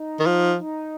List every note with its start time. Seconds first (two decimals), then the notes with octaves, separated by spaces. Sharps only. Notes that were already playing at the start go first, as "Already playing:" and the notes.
Already playing: D#4
0.20 D#3
0.26 F3
0.59 D#4